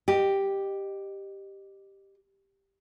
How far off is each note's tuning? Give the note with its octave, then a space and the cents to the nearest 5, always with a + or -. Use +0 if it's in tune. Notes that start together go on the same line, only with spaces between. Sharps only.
G4 +0 D#5 -25